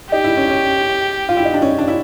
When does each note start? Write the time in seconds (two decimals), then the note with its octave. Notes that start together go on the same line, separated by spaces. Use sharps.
0.11 D#4 G4
0.24 E4
0.37 C#4
0.50 C#4
1.29 F4
1.37 E4
1.45 D#4
1.54 D4
1.62 C#4
1.78 D4
1.88 E4